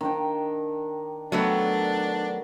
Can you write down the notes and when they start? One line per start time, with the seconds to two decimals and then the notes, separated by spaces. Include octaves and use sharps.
0.01 D#3 D4 G5
1.32 F#3 A3 B3 D4 D#5 G5